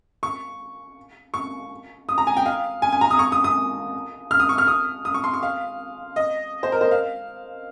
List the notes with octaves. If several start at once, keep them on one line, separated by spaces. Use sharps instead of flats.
C#6
C#6
D#6
A#5
G#5
G5
F5
G#5
G#5
A#5
D#6
C#6
D#6
D#6
F6
D#6
C#6
F6
D#6
D#6
C#6
C6
C#6
F5
D#5
C5
A#4
C5
F5